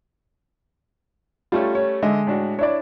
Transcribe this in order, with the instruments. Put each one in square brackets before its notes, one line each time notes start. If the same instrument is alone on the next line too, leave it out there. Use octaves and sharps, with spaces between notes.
[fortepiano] G3 A3 C#4 [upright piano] F4
[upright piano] C#5
[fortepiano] D3 D#5 E5 [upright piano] G#3
[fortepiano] A2 D4 F#4
[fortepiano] D4 E4 [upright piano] C#5 D5